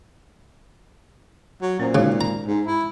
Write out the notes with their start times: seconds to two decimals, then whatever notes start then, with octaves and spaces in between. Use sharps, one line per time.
1.62 F#3
1.80 A#2 C#4 C5
1.95 C#3 G#3 D#4 F#4
2.21 A#5
2.47 G#2
2.67 E4